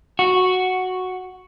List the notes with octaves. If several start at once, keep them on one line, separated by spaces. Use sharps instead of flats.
F#4